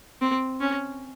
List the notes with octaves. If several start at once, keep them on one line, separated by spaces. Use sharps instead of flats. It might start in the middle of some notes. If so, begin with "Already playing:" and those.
C4
C#4